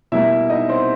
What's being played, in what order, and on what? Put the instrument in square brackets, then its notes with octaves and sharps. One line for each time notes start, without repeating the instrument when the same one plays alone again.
[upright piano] B2 G3 A#3 E4 E5
D#4 D#5
C4 C5